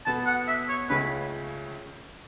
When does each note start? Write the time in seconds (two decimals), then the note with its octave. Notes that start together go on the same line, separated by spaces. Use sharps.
0.06 B2 B3 A4 A5
0.27 F#5
0.48 E5
0.69 C#5
0.90 C#2 C#3 A3 C#4 B4